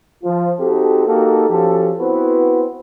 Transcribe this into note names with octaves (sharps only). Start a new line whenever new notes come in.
F3 F4
C4 D#4 F#4 G4 A4
A#3 D#4 F#4 G4 A4
F3 C#4 F#4 G4 A4
B3 C4 E4 F#4 B4 C5